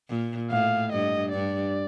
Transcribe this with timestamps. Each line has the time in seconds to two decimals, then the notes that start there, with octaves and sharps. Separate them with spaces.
0.09 A#2
0.50 A2 F5
0.92 G2 D#5
1.33 G2 D5